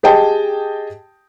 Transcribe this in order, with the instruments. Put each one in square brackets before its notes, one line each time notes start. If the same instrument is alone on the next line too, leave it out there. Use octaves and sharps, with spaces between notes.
[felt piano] G4 G#4 D#5 G5 A5